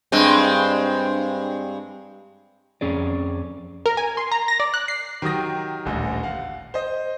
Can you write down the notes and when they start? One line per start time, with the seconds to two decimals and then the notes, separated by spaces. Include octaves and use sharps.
0.12 G2 G#3 C4
2.81 F2 C#4 G#4 D5
3.86 A#4
3.97 G#5
4.17 C6
4.32 A#5
4.48 A#6
4.60 D5
4.74 F#6
4.88 C7
5.22 D#3 F#3 G4 D#6 A#6
5.85 D#1 A1 D2
6.23 F5 F#5
6.74 C5 D#5